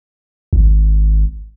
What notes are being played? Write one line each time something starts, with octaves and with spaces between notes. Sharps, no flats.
G#1